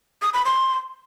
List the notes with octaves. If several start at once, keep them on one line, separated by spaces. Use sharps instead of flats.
D#6
B5
C6